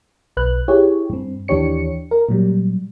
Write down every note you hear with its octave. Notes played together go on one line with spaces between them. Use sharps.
B1 B4 F#6
E4 G4 G#4 C#5
G2 C4
D#2 E3 D4 G4 C#5 C#7
A#4
A#2 F#3 G3